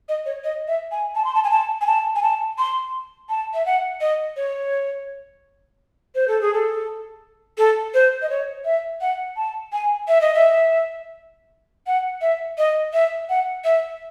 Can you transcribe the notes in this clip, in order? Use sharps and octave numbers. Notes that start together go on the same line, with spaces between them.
D#5
C#5
D#5
E5
G#5
A5
C6
A5
G#5
A5
G#5
A5
G#5
A5
C6
A5
E5
F#5
D#5
C#5
C5
A4
G#4
A4
A4
C5
D#5
C#5
E5
F#5
A5
G#5
E5
D#5
E5
F#5
E5
D#5
E5
F#5
E5